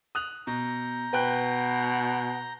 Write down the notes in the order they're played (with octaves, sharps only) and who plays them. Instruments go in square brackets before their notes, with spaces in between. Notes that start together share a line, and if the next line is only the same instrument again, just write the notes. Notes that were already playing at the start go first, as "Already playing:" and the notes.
[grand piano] D#6 F#6 F7
[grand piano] B2 [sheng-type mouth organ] A#5 G6
[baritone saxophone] B2 [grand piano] B4 G5 F#6